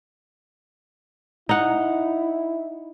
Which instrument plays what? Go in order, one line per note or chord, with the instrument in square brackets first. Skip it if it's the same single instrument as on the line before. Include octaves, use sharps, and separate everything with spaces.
[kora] D#4 F#5 [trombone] E4